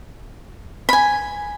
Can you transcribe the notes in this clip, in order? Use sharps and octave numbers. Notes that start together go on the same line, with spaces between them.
G#5 B5